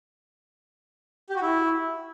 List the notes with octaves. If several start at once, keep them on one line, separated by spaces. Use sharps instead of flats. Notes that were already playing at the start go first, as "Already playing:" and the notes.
G4
F#4
E4